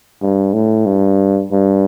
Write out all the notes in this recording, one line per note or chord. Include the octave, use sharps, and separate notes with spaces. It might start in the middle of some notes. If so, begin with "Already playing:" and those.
G2
A2
G2
G2